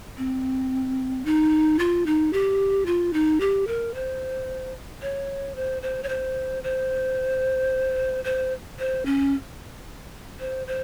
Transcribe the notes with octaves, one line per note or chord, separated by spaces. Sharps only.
C4
D#4
F4
D#4
G4
F4
D#4
G4
A#4
C5
C#5
C5
C5
C#5
C5
C5
C5
C5
C#4
C5
C5